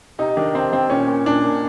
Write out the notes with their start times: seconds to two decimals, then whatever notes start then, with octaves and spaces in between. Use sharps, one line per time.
0.19 C3 D#4
0.37 D#3 D4
0.54 C3 C4
0.72 D#3 C4
0.89 A#2 C#4
1.08 A#2
1.26 A#2 D4
1.44 A#2